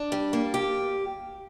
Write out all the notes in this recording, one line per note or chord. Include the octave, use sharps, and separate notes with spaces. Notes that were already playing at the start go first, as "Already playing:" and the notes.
Already playing: D4
G3
A#3
G4